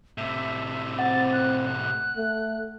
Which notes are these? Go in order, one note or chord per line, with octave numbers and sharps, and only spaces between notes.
A2 C3 E5
C4 F#5 A6
F#6
F#6
A3